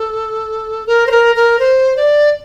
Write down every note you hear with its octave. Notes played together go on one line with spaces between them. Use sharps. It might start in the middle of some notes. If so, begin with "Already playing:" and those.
Already playing: A4
A#4
C5
A#4
A#4
C5
D5